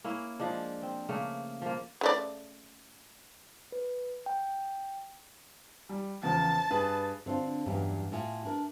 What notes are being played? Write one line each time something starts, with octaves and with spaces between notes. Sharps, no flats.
A#3 C#4 E4
F3 G#3 D4
C4
C#3 A3 A#3
F3 A#3
C#3 A3 D5
B4
G5
G3
E2 C#3 F3 A5
G2 G#4 B4
D3 C4 D4 F4
E2 G2 A#2 F#3 G3 C#4
A2 F4 G#5
D4 A#4